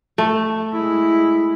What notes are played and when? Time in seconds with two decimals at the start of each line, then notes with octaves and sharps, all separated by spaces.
0.18 A3
0.73 G#3 E4